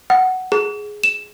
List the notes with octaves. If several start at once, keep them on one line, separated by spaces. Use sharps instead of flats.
F#5
G#4
E7